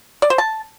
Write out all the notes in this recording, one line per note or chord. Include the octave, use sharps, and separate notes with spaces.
D5
C5
A5